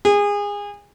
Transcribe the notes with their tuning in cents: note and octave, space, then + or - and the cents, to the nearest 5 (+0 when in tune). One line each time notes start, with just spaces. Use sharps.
G#4 -25